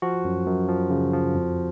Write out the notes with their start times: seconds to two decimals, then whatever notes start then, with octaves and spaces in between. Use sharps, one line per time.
0.02 F3 F#4
0.25 F#2
0.47 F#2
0.68 F3
0.90 C#3
1.13 F3
1.35 F2